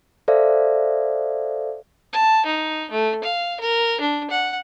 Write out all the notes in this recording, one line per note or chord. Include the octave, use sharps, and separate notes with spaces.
A4 C5 D5 E5 F5
A5
D#4
A3
F5
A#4
D4
F#5